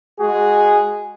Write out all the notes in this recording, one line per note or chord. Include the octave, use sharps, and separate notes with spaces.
G#3 F#4 G#4